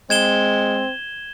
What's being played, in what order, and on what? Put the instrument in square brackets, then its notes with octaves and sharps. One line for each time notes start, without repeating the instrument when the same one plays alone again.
[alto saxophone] G#3 [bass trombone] C4 [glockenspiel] G#6 E7 G7